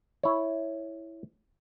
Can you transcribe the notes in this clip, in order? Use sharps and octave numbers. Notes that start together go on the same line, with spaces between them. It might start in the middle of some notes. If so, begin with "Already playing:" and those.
E4 C#5